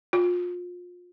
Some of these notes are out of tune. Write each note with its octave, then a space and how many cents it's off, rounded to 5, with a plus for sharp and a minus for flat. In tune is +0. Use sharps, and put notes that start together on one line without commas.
F4 +30